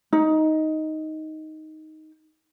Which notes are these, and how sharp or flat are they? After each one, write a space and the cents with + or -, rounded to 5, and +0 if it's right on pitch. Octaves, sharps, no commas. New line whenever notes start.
D#4 +5